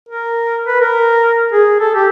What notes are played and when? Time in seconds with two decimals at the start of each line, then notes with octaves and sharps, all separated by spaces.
0.09 A#4
0.66 B4
0.81 A#4
1.52 G#4
1.80 A4
1.95 G4